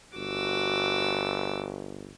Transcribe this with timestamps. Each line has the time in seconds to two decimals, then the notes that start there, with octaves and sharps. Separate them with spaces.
0.16 G1 F#4 D6 E6